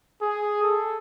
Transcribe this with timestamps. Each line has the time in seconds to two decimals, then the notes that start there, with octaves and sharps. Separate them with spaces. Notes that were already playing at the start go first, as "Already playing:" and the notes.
0.21 G#4
0.63 A4